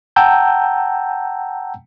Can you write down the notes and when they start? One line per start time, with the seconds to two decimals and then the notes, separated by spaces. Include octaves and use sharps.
0.16 F#5 G5 A5 A#5 E6 G6